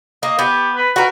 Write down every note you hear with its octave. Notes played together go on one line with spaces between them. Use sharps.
A#3 D#5
B3 G4
B4
F#4 A#4 B4